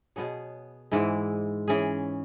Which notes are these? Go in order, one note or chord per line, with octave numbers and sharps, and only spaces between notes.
B2 B3 G#4 C#5
G#2 E3 G#3 E4
E3 C#4 G#4